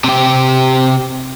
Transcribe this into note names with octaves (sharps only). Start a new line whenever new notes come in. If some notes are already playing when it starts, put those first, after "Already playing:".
C3 G4